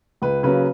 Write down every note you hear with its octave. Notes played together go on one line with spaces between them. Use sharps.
C#2 B4
C#3 F#3 A#3 B4